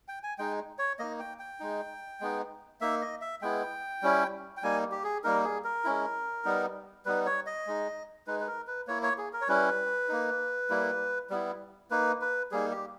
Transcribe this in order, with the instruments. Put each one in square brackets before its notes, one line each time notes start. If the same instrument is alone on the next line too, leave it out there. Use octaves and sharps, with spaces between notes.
[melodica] G5
G#5
G#3 D#4 G5
C#5
A#3 D#4 D#5
G5
G5
G#3 D#4
G#3 B3 D#4
A#3 D#4 E5
D#5
E5
G#3 B3 E4 G5
G3 C#4 E4
G5
G3 A#3 D#4 G#5
G4
G#4
G3 A#3 D#4 A#4
G#4
A#4
G#3 C#4 E4
G3 B3 D#4
G3 B3 D#4 B4
C#5
D#5
G#3 D#4
G#3 D#4 B4
B4
A#4
B4
A#3 E4 C#5
C#5
G#4
A#4
C#5
G3 C#4 E4 B4
A#3 D#4
G3 A#3 E4
G3 B3 E4
A#3 D#4 B4
B4
G3 A#3 D#4 G#4
G4